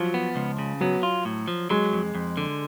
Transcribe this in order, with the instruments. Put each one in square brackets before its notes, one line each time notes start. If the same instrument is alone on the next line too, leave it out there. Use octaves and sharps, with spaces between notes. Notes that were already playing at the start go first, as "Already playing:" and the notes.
Already playing: [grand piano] F3 [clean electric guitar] F#3
[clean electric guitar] B3
C#2
C#3
[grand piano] F#3 [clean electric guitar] B3
[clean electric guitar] F4
A2
F3
[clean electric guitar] F#3 [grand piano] G#3
[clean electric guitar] F2
F2
D3